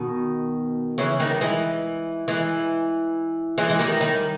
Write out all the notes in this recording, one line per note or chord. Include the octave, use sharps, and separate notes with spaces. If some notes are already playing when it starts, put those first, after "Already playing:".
Already playing: B2 D#3
C#3 E3
D#3 G3
E3 G#3
E3 G#3
E3 G#3
G#3
D#3 G3
D#3 G3